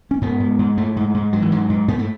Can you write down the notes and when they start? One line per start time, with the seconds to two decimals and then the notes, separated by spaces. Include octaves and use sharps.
0.11 C#4
0.21 G#2 B3
0.40 G#2
0.59 G#2
0.77 G#2 A3
0.96 G#2
1.14 G#2
1.33 G#2 F#3
1.42 E3
1.52 G#2 F#3
1.69 G#2
1.88 G#2 B3
1.99 A3